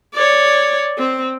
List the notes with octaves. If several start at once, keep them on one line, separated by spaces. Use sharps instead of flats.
C#5 D5
C4